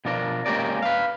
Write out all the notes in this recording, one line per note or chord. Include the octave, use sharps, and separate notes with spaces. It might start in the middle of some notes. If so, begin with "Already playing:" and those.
B2 F3 D4 A#4
G#3 A#3 C#4 G4 A#4 D5
B4 F5